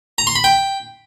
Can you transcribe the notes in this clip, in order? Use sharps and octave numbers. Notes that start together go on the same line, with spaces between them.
A#5
C6
B5
G5